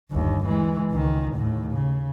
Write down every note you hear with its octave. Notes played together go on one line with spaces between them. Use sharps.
G1 D#2
E3 G#3
C#2 D#3
D#2 A2
C#3